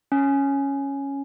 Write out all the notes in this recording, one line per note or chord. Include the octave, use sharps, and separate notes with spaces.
C#4